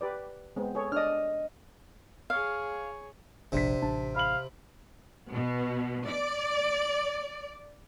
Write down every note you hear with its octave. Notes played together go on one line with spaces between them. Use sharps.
G4 B4 D5
G#3 B3 C4
G#4 A4 C#5
D4 D5 D#5 F6
G#4 C#5 F5
F1 A#1 C3 D4 C5 B6
A1 D4 A5
F5 B5 F#7
B2
D5